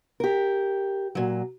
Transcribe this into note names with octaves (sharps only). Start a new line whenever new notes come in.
G4 A#4
A#2 F#3